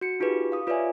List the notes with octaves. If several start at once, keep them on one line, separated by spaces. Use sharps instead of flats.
F#4 C#7
D#4 F4 G4 G#4 B4
F5 D#6
F4 B4 C#5 D5 E5 G#5